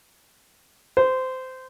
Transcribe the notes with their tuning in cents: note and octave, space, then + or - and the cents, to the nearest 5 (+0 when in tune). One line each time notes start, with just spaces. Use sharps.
C5 -20